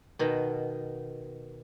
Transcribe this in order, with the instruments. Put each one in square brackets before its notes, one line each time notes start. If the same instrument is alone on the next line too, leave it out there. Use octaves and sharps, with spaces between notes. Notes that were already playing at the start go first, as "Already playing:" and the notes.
[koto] B2 D#3